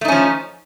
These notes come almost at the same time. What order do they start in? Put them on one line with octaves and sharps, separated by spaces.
A3 D#4 C#4 F3